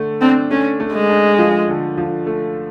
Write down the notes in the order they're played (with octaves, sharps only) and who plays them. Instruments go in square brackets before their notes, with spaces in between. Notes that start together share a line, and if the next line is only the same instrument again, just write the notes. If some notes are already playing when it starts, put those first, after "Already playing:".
Already playing: [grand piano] D3 A3
[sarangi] C4 [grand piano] D4
[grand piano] A3 [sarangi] C#4
[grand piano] A3
[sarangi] G#3
[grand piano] D4
F3
D3
F3
A3